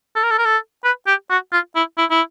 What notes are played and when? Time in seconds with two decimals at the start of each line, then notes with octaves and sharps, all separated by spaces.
0.16 A4
0.23 A#4
0.31 A4
0.38 A#4
0.45 A4
0.84 B4
1.07 G4
1.30 F#4
1.52 F4
1.76 E4
1.98 E4
2.10 E4